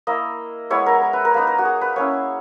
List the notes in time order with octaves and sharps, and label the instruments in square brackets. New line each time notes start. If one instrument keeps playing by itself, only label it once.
[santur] A#3 E4 D#5
G#3 B3 E4 C#5
A#4
A#4
B4
A#4
A#3 D#4 B4
A#4
F#4
G#4
B4
A#3 C#4 E4 C#5